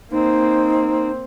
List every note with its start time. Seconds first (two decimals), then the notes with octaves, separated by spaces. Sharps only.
0.12 A#3 C4 D#4